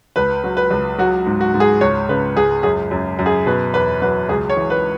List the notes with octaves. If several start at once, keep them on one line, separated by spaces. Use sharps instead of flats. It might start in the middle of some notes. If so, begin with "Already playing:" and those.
C#2 B4
F#3
B4
C#2
F#3 F#4
G#2
F#4
G#2
G#4
C#2 C#5
C#3 B4
C#2 G#4
F#2 G#4
F#2
F#2
G#4
B2 B4
E2 B4
F#3 B4
C#2 G#4
C#5
E3
B4